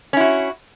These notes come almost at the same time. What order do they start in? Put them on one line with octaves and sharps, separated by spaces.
C#4 E4 F#4